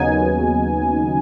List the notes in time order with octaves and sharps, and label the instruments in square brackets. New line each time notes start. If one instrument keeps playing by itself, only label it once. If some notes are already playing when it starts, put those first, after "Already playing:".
Already playing: [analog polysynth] D#2 C#3 F#3 B3 D#4 G#5